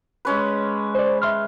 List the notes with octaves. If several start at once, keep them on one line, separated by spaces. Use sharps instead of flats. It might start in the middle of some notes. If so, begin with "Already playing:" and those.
G#3 C#4 B4
C5 D5
E5 C6 F6